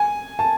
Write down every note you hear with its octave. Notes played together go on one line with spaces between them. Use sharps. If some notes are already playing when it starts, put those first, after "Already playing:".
Already playing: G#5
A5